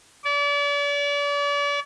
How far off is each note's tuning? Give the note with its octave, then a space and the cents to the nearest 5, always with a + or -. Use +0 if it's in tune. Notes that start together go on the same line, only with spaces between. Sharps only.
D5 -40